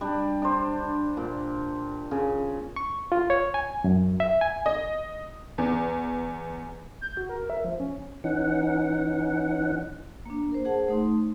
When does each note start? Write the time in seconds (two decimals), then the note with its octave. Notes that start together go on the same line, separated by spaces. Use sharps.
0.01 G3 D4
0.42 D4 C5
1.17 A#2
2.11 C#3
2.76 C#6
3.12 F4
3.30 C#5
3.54 G#5
3.84 F#2
4.20 E5
4.41 G#5
4.66 D#5
5.58 E2
7.01 G6
7.17 F#4
7.29 A#4
7.50 E5
7.65 F3
7.80 C#4
8.24 E3 C#4 D#4 F#5
10.26 A#3 D4
10.52 A#4 C5
10.65 G#4 C5 F#5 A5
10.88 A3 D#4 C6